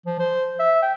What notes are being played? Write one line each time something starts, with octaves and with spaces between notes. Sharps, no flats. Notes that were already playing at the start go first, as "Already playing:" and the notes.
F3
C5
E5
G5